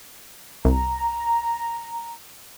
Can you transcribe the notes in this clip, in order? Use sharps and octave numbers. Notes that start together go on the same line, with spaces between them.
C2 A#5